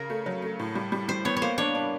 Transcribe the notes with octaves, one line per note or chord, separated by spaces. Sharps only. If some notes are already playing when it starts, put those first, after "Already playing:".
Already playing: C#3 A#4
A3
F#3
A3
A2
G3
G3
G3 C5
B3 C#5
C#5
A#3 C5
D4 C#5
D4